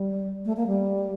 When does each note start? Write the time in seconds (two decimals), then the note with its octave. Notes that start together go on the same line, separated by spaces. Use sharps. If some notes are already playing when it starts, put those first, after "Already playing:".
Already playing: G3
0.45 A3
0.57 A#3
0.67 G3